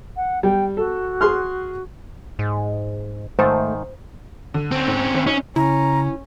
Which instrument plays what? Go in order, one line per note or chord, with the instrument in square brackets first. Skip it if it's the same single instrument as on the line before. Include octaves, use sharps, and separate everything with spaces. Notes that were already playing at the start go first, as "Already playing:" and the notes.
[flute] F#5
[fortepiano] G3 [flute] G5
[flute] F#4 [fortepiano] A4
[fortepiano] G#4 C6 F6
[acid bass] G#2
[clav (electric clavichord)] G#2 D#3 [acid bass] A3 [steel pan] C5
[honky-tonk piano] D3
[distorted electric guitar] C4 C#4
[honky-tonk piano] G#2
G#1
[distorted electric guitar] C#4 [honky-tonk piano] D#4
[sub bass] C#3 [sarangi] C#4 [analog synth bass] E4 [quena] A#5